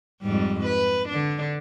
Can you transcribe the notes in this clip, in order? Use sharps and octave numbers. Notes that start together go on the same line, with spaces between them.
F2 G#2 G3
B4
D3 D4